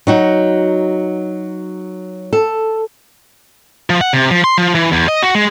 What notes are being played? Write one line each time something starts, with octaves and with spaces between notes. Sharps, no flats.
F#3 D#4 F#4
A4
F3
F#5
C3
F3
C6
F3
E3
E2
D#5
F#4
G#3